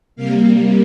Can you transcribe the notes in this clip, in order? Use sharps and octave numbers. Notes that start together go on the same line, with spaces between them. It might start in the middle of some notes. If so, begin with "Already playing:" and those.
C3 G3 A#3 F5